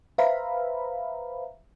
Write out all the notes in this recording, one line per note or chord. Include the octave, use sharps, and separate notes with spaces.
B4 C5 E5 F5 A#5 B5